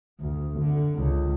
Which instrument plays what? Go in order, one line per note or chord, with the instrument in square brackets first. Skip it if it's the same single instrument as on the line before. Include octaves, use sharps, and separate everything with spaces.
[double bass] D2
D3
C#2